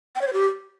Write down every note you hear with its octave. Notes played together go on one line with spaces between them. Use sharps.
G5
C#5
C5
G4